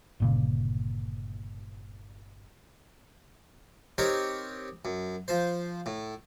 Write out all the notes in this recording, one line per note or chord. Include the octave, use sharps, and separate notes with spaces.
G1 A#2 C#3
C4 D#4 G4 A#4 C#5
F#2
F3 C5
A2